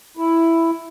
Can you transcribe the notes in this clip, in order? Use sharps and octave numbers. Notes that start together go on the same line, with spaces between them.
E4